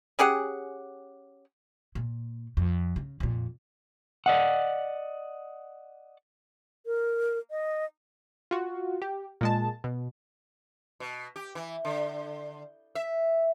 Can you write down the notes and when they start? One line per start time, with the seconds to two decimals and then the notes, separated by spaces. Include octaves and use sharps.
0.19 C#4 G4 G#4 F#5
1.95 A#2
2.57 F2
2.96 C#3
3.20 F2 A#2
4.26 D5 D#5 F#5
6.86 A#4
7.51 D#5
8.51 F4 F#4
9.02 G4
9.41 A#2 G#3 A5
9.84 B2
11.00 B2
11.36 G4
11.55 E3
11.85 D3
12.95 E5